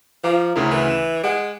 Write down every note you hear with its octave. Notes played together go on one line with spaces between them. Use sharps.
F3 F5 A#5 D6
D2 C#3 E4 A#4
E3
E7
G#3 F#5 D7